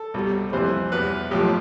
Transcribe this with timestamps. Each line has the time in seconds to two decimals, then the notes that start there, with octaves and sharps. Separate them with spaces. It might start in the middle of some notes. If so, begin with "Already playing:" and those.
Already playing: A4
0.14 C2 B2 G3
0.53 F2 C3 E3 G3 C5
0.92 E2 B2 G3 B4
1.31 B1 A2 F3 G4